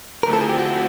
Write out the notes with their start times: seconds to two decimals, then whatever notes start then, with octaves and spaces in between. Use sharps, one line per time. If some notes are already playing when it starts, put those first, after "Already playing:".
0.23 D3 F3 A3 C4 E4 A#4
0.33 A4
0.41 G#4
0.49 G4
0.59 F#4